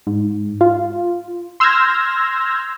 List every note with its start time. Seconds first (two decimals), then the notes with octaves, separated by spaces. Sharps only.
0.07 G#2
0.61 F4
1.60 C6 E6 F6 G6 G#6 A#6